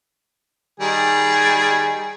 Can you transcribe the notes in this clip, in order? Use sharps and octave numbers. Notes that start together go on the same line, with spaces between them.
D#3 G3 G#4